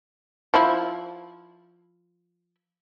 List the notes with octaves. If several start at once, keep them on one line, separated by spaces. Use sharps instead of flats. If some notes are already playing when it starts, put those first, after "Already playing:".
F3 E4